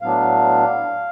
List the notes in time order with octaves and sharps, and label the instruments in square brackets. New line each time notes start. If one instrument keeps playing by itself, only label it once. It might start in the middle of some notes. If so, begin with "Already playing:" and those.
[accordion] A2 F#3 B3 D4 F5